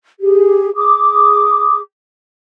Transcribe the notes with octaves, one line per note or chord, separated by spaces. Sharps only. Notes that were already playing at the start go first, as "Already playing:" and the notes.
G4 G#4
G#4 D6 D#6